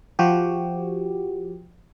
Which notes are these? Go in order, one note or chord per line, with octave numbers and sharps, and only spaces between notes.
F3 F#4 G4